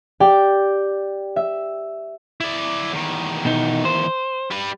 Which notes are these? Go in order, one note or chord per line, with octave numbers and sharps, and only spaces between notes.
G4 D5 G5
E5
E4 D5
E2 D#3
B2 D#4
C5
G3 B4